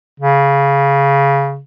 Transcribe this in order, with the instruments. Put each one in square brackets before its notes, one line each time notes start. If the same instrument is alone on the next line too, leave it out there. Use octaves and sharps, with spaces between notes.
[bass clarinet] C#3